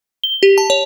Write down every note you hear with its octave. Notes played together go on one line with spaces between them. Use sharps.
G7
G4
A5
C#5